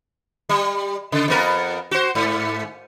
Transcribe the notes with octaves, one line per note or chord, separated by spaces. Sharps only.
G3
C#3
F2 B3 A#4
F#4 C5
G#2